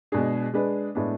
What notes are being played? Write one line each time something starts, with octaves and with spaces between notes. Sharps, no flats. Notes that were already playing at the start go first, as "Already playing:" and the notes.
B2 G#3 D4 G#4
G#3 D4 G#4 B4
A2 G#3 B3 D4